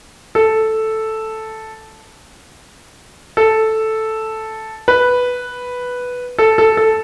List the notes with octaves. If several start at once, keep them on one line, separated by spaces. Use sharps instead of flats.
A4
A4
B4
A4
A4
A4